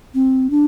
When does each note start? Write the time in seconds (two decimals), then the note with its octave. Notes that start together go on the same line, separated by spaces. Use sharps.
0.15 C4
0.50 D4